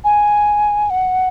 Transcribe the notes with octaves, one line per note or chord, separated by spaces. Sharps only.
G#5
F#5